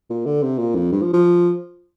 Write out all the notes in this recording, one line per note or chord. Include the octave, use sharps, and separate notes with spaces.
A#2
D3
C3
A#2
F2
G2
F3
F3